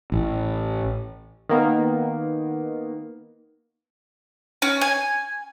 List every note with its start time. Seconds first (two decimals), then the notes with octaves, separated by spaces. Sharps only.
0.12 A1
1.49 D#3 A#3 B3
4.62 C#4
4.81 G#5